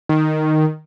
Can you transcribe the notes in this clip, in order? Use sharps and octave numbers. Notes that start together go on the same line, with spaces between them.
D#3